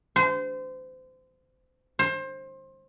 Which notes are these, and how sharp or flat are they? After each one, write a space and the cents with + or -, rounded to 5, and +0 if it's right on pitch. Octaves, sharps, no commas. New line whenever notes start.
C5 -30
C5 +25